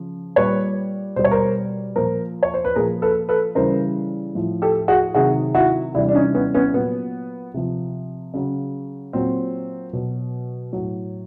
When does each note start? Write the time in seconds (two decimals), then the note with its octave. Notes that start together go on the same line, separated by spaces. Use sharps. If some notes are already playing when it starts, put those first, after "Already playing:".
Already playing: C#3 F3
0.36 A#2 G3 B4 C#5
1.16 B2 G3 C5
1.24 C#5
1.31 A#4 C5
1.96 A#2 F3 A#4 C5
2.43 C#5
2.54 C5
2.65 B4
2.76 A#2 F3 G#4 A#4
3.02 A4 B4
3.29 A4 B4
3.55 C#3 E3 G3 A#4 C5
4.35 A2 F3
4.62 G4 A4
4.88 F#4 G#4
5.14 C3 D#3 F#3 F#4 G#4
5.55 E4 F#4
5.94 C3 E3 G3 D4 E4
6.09 D4
6.14 C#4 D#4
6.34 B3 C#4
6.54 B3 C#4
6.74 A#2 F#3 B3
7.54 C3 F3
8.34 C#3 F#3
9.13 A#2 F#3 C4
9.93 B2 F#3
10.73 A2 F#3